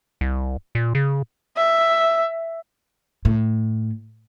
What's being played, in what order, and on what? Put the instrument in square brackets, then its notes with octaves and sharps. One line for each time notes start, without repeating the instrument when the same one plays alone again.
[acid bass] C2
A#2
C#3
[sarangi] E5
[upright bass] A2